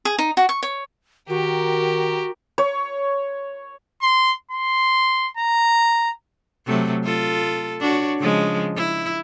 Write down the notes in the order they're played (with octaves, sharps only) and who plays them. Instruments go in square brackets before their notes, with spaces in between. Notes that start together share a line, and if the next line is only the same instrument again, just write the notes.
[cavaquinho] G#4
D#4
F#4
C#6
C#5
[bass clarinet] D#3 [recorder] F#4 [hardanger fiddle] G4 A#4
[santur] C#5
[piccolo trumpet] C6
C6
A#5
[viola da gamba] C3 F#3 A3
F4 A4
D4 F#4 C#5
C#3 F3 G#3
E4